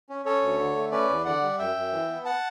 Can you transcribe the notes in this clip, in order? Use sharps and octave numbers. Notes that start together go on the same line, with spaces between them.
C#4
C#4 A4 C#5
D2
D3
A3
C#4 B4 D5
E2
D3 D5 F#5
G3
F#2 E5 G5
F#2
E3
B3
F#5 A5